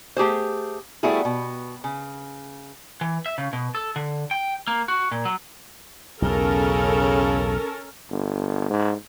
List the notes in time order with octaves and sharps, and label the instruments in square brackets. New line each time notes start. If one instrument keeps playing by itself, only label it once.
[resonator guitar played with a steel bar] A3 G4 G#4 C5
G3 A3 B3 E4 F#4 G#4
B2
C#3
[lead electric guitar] E3
E5
C#3
B2
A4
D3
G5
A#3
F#4
A#2
F#3
[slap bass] B1 E2 [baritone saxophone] C#3 [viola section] C#4 A4 A#4
[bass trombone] G1
G#2